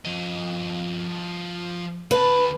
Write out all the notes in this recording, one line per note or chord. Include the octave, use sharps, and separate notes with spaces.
F3 D#5
D2 B4 A5